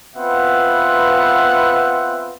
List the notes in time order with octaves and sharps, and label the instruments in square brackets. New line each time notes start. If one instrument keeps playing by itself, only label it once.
[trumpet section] B3 C4 F4 B4 E5 F#5